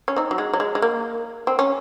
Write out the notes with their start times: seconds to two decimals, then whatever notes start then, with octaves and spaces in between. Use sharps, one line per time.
0.08 C#4
0.16 C4 D#4
0.31 F#3
0.38 G#3
0.53 F#3
0.60 G#3
0.75 G#3
0.82 A#3
1.47 C4
1.59 C#4